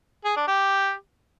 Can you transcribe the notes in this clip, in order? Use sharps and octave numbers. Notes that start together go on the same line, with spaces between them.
G#4
D4
G4